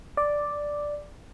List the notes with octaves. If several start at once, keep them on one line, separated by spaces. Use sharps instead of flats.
D5